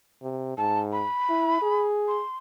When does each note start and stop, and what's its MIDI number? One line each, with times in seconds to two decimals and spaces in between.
0.22 0.53 48
0.57 1.05 44
0.57 0.79 81
0.92 1.83 83
1.29 1.59 64
1.62 2.21 68
2.08 2.37 84